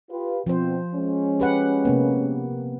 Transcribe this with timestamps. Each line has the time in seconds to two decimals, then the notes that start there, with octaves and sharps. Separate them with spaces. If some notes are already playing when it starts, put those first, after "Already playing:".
0.11 F4 G4 B4
0.47 B2 F3 C4 C5
0.94 G#3 C#4
1.40 G4 B4 F#5
1.85 C3 A#3 B3